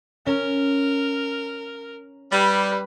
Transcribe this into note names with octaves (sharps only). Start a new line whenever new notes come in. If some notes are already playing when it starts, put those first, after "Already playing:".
C#4 A#4
G3 B4